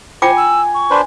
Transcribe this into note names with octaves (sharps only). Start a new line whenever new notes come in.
F4 C5 G5 G#5 D6
E6
C#6
D4 B4 C5